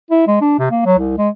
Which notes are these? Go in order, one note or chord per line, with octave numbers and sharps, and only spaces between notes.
E4
G#3
D4
C3
A#3
F#3
C2
G#3